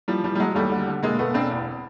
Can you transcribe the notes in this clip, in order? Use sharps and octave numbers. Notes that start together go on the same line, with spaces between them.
E3 F3 G3
E3 F3 G3
G3
E3 F#3 G#3
D#2 G3 A3
D3
D3
E1 G#3 A#3
E1 A3 B3
E1 C4 D4
E2